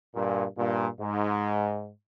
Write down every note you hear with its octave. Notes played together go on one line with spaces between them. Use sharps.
G2 A#2
G2 A#2
G#2